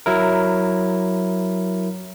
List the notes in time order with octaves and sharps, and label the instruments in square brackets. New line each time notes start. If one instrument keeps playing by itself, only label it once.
[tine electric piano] F#3 E4 A#4